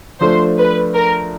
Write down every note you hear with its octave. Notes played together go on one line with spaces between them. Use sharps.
F3 A3 D4 C5
B4
A#4